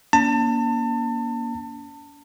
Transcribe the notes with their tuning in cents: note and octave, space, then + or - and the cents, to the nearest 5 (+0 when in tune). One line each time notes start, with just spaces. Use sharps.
A#3 +25 C#4 +45 A5 +30